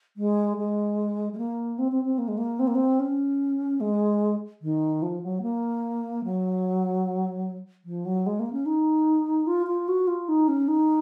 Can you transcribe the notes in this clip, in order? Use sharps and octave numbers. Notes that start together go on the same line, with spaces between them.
G#3
G#3
G#3
A#3
C4
C4
C4
A#3
G#3
A#3
C4
A#3
C4
C#4
G#3
D#3
F3
F#3
A#3
F#3
F3
F#3
G#3
A#3
C#4
D#4
F4
F4
F#4
F4
D#4
C#4
D#4